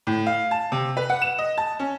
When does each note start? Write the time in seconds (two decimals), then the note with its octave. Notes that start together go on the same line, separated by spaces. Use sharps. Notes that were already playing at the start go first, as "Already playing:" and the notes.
0.07 A2
0.27 F5
0.51 A5
0.72 C3
0.97 B4
1.10 F#5
1.22 E7
1.38 D#5
1.57 A5
1.79 C#4